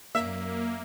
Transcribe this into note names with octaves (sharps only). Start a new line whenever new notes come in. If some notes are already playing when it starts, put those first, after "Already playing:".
F#2 A#3 E5